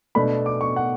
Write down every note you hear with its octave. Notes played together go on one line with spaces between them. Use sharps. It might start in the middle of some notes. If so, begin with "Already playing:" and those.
B2 A3 D4 B5
D6
C#6
F#5